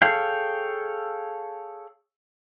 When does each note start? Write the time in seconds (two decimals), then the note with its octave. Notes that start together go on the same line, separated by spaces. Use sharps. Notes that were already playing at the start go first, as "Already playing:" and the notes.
0.02 G#4 A4 C#5 F5 G5